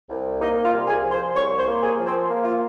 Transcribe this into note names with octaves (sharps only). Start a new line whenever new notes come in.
C2
A#3 D#4 D#5
F4 F5
C2
G#4 G#5
F3
C5 C6
C2 C#5 C#6
C5 C6
A#3
G#4 G#5
F3
C4 C5
A#3
F4